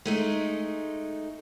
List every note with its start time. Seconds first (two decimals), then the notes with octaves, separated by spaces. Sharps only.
0.05 G#3 A3 D#4